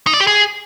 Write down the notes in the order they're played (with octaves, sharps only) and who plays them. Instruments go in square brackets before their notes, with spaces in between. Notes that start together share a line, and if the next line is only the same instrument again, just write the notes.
[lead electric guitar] D#4
D5
G4
G#4